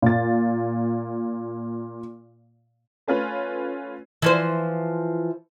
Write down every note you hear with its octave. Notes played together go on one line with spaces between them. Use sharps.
A#2 A6
A3 C#4 F4 B4
E3 F3 C5